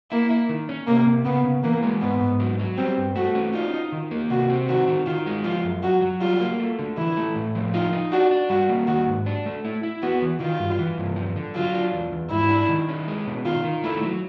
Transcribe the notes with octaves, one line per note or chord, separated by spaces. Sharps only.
A#3 E4
E4
D#3
C#4
C3 A#3
C3
C#3 B3
C#3
E3 A#3
G#3
G#2 B3
G#2
F#3
F#3
G3 C4
G2
A3 F#4
C#4
D#4 F4
D#4
D#3
A#3
C3 F#4
C4
D#3 F#4
D#3
D#3 F4
G#3
F3 F4
F#2
F#3 F#4
F#3
G3 F4
A#3
A3
D3
E3 E4
A3
A2
F3
D#4 F4
D#4
D4 F#4
D4
G3 F#4
A#3
D#3 F#4
G#2
D4
A3
E4
E4
B3 F#4
E3
D#3 F4
G2
E3
G2
F3
D3
F#3 F4
D4
E2
E2
G#2 E4
D4
D#3
C#4
G#3
B2
D#3 F4
D#3
A3 E4
F#3